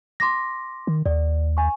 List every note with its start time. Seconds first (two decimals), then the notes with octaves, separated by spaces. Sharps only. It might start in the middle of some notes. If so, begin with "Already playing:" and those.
0.20 C6 D6 A#6
0.87 D#3
1.06 D#2 D5
1.57 G#5 C#6